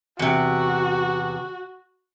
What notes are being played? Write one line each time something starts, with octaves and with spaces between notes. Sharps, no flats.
E2 C3 F#4